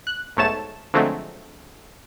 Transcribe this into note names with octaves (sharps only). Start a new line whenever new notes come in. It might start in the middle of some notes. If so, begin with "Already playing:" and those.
F#6
B1 G#2 A3 C#5 A5 E7
D3 F3 F#3 G#3 A3 C4